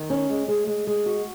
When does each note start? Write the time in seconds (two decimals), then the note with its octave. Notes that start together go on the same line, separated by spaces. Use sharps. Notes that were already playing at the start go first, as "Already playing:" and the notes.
Already playing: D#3
0.10 C#4
0.30 G#3
0.48 G#3
0.67 G#3
0.87 G#3
1.06 F#4